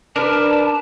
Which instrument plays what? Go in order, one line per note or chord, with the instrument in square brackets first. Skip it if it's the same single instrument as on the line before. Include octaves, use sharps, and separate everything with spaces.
[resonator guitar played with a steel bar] D4 B4 [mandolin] A#4 [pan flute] A5